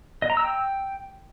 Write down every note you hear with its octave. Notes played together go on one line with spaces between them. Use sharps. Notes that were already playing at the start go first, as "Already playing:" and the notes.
D#5
A#5
E6
G5